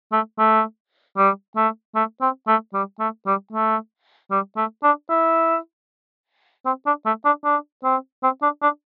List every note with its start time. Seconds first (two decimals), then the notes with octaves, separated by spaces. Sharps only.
0.12 A3
0.39 A3
1.18 G3
1.56 A3
1.95 A3
2.21 C4
2.48 A3
2.74 G3
3.00 A3
3.26 G3
3.53 A3
4.31 G3
4.57 A3
4.83 D4
5.10 E4
6.66 C4
6.86 D4
7.06 A3
7.25 D4
7.45 D4
7.84 C4
8.23 C4
8.43 D4
8.62 D4